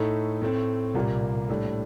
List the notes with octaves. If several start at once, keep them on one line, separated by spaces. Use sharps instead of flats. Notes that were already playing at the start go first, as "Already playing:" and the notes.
Already playing: A2 A3 D#4 A4
A2 A3 C4
C2 A#2 G3 A#3
A2 G3 D4 A4